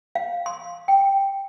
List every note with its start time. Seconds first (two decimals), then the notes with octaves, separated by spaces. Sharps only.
0.15 F5
0.46 C6
0.88 G5